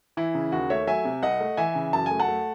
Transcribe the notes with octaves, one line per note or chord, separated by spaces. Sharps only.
E3 E4
C#3
D#2 F#4
A3 C#5 E5
F#3 E5 G#5
C3
C2 D#5 F#5
A3
E3 E5 G#5
C#3
F#2 A5
A3 G#5
F#5 A5
A3